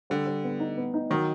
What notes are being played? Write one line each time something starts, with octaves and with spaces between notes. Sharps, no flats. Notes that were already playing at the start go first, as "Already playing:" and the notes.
D3 G3
G3
B3
D#4
B3
D#4
D#3 F#3